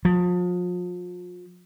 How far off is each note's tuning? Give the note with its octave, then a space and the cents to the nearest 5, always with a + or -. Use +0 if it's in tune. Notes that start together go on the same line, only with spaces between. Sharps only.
F3 +35